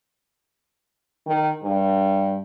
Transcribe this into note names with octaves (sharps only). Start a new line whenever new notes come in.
D#3
G2